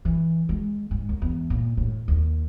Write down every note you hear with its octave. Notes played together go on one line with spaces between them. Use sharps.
E3
G#3
G#2
D#2
E2
A#2
A2
D#2